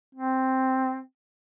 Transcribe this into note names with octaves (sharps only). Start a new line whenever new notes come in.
C4